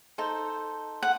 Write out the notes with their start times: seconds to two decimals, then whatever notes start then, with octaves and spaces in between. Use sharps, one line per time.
0.18 D#4 A4 C5
1.03 F#5